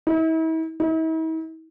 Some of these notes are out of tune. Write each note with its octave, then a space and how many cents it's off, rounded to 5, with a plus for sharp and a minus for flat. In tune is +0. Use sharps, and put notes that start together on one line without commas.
E4 -40
E4 -45